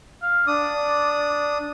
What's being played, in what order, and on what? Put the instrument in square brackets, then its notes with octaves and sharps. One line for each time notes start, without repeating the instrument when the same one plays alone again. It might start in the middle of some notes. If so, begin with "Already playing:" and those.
[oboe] F5
[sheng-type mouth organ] D4 D#6 [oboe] D5